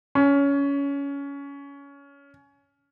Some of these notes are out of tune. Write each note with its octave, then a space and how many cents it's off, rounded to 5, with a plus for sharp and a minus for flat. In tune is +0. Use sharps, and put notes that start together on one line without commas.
C#4 +20